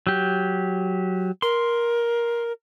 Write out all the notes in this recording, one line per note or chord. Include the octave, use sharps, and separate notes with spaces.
F#3 G4
A#4 C6